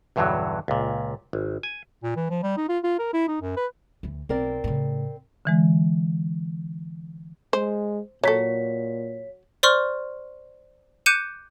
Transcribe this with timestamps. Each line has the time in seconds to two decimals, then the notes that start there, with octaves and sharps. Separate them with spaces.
0.16 B1 E2 G2 D3 E3 F#3
0.68 C#2 A#2
1.33 G#1
1.63 G#5
2.03 A#2
2.16 E3
2.30 F3
2.43 G3
2.57 D#4
2.69 F4
2.84 F4
2.99 A#4
3.13 E4
3.28 D#4
3.41 F#2
3.57 B4
4.03 D2 E3
4.29 B1 C4 A#4 D5
4.64 A2 C#3
5.45 D3 E3 G#3
7.53 G#3 C5
8.24 A#2 F#3 A4 C#5 B6
9.63 C5 D5 C6 C#6 F6
11.06 D6 F#6 G6 C#7 D#7 E7